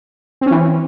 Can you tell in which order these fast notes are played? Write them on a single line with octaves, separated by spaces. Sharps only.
C4 C#4 E3